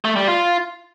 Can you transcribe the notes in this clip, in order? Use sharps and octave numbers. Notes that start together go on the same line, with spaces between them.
A3
G3
F4